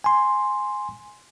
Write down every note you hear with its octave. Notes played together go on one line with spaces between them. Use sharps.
G#5 C6